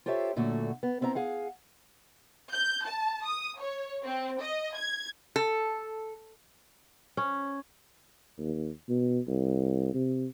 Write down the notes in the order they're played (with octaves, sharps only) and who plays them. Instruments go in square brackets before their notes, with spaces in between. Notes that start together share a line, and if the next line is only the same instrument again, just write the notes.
[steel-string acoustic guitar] F4 G4 A4 C5 C#5 E5
F#2 A#2 D3 A3 F#4
B3
B3 C4 E4 E5 A#5
G#4 F5 F#5
[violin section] G6
A5
D#6
C#5
C4
D#5
G#6
[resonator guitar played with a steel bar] A4
[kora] C#4
[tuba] D#2
B2
C2
C3